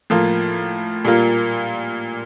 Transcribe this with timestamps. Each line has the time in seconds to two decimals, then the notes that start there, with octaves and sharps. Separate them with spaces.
0.10 A2 F3 A#3 F4
1.05 A#2 G3 A#3 F4